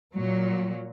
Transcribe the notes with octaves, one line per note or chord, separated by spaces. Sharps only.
A#2 F#3